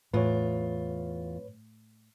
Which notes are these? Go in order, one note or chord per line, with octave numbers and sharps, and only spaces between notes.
E2 A2 F4 B4 C#5